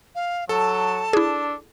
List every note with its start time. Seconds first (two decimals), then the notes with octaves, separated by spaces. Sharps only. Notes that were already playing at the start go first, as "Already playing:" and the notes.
0.15 F5
0.49 F#3 A4 A5
1.13 D4 E4 G#4